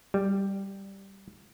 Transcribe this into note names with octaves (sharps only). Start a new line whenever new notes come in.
G3